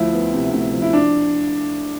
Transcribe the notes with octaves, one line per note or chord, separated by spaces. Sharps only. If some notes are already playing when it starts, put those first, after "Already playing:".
Already playing: D2 F3 E4
B3
C3
D2
F3
E4
D4